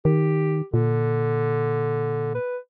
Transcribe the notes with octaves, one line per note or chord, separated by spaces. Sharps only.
D#3 G4
A#2 D3
B4